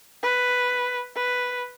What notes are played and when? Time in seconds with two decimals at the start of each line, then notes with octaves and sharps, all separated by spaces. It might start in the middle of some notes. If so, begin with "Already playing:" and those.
0.23 B4
1.16 B4